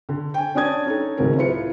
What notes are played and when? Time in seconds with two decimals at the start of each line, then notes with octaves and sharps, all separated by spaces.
0.09 D3
0.34 G5 G#5
0.55 C#4 D4 D5 D#6 G#6
0.85 C#4 D#4 A4
1.17 C#2 A2 D#3 F#3 C4 A#4
1.38 E4 F4 B4 C#7